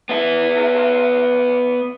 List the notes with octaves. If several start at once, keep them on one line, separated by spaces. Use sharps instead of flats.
B3 E5